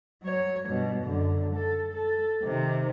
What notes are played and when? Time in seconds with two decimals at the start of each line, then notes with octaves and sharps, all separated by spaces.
0.23 F#3 C#5
0.69 G2 B2
1.04 F#2 D3
1.55 A4
1.93 A4
2.44 C3 D#3